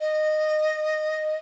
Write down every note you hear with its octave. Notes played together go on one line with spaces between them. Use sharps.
D#5